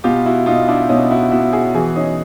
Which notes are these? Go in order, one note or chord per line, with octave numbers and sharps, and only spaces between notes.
B2 F4 G4
E4 F#4
B2 D#4 F4
D4 E4
B2 C#4 D#4
E4 F#4
B2 E4 F#4
F#4 G#4
E3 F#4 G#4
C#4 D#4